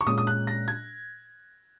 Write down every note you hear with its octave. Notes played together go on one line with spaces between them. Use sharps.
C#6
A#2 G#3 C#4 D#6
D#6
F#6
A#6
G#6